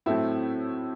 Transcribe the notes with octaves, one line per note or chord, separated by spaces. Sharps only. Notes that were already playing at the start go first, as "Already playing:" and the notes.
A2 F#3 A3 C4 E4